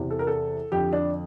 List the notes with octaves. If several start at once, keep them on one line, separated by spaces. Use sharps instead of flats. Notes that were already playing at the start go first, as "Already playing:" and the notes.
Already playing: E2 C3 E3
A4
A#4
A4
F2 D3 G4
D4